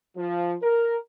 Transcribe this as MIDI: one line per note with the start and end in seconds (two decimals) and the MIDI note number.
0.16 0.54 53
0.62 0.97 70